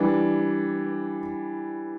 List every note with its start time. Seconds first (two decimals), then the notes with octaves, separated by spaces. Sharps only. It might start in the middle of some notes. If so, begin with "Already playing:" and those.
Already playing: E3 G3 D4